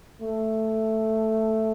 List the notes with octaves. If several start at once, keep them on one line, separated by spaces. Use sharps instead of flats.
A3